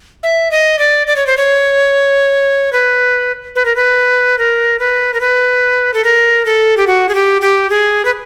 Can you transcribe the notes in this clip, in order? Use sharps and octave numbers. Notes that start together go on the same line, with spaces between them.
E5
D#5
D5
D5
C#5
C5
C#5
B4
B4
A#4
B4
A#4
B4
A#4
B4
A4
A#4
A4
G4
F#4
G#4
G4
G4
G#4
B4